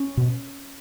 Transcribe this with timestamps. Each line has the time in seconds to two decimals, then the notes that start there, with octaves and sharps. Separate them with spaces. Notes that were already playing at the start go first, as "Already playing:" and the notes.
Already playing: C#4
0.17 B2